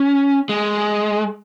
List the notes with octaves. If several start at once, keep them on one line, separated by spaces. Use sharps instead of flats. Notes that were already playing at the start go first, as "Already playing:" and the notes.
Already playing: C#4
G#3